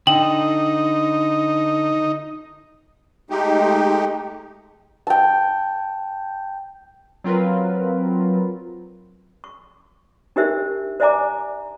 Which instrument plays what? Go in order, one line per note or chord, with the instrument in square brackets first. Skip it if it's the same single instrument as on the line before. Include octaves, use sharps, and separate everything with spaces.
[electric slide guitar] D3 [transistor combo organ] D#4 [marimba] G5 [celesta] F#7
[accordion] G#3 A3 D#4 G4
[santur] G5 A5
[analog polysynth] F#3 C4 F4 A#4 B4
[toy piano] C#6
D4 D#4 G4 A#4 C5 E5
C5 D5 E5 G#5 A#5 D6